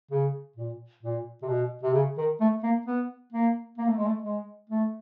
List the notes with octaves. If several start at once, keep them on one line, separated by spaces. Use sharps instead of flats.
C#3
A#2
A#2
C3
B2
C3
C#3
D#3
A3
A#3
B3
A#3
A#3
A3
G#3
A3
G#3
A3